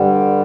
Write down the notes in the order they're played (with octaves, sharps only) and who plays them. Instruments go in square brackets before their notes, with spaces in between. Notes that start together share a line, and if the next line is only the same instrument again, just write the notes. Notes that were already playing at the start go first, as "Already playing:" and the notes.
Already playing: [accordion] G2 D3 G3